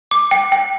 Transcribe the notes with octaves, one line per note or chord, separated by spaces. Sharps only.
D6
G5
G5